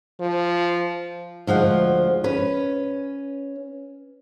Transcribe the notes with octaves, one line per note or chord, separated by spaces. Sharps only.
F3
D2 F3 G#3 F#5
C#4 B4